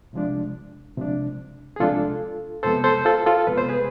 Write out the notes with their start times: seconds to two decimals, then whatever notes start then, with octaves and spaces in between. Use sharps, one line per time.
0.13 C2 C3 F3 G#3 D4
0.97 C2 C3 F3 G#3 D4
1.76 G#4
1.80 C2 C3 F3 G#3 D4 F4 A4
2.63 F2 C3 G#3 B3 A4 C5
2.84 A4 C5
3.05 F4 A4
3.26 F4 A4
3.47 F2 C3 G#3 B3 B4
3.58 C5
3.69 G#4 B4